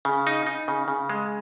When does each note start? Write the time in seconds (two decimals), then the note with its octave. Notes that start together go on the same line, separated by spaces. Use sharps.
0.05 C#3
0.27 D#4
0.46 D#4
0.68 C#3
0.88 C#3
1.10 G#3